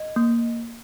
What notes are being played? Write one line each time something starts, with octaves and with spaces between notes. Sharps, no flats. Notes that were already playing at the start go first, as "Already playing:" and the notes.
Already playing: D#5
A#3